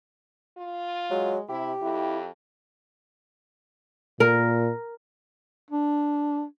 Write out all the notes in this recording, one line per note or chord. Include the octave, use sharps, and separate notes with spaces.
F4
F#3 G#3
C3 E4 G4
F2 E4
A#2 A#4
D4